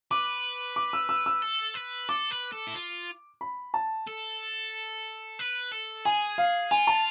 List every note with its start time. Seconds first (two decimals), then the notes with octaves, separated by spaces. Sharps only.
0.11 B4 D6
0.76 D6
0.93 E6
1.09 E6
1.26 E6
1.43 A4
1.75 B4
2.09 A4 D6
2.31 B4
2.52 A4
2.67 E4
2.75 F4
3.41 B5
3.74 A5
4.07 A4
5.39 B4
5.72 A4
6.05 G#4 G#5
6.38 F5
6.71 F4 G#5
6.87 A5